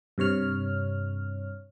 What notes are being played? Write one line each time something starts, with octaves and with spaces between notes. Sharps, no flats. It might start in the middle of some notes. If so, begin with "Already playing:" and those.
G2 C3 C#5 F6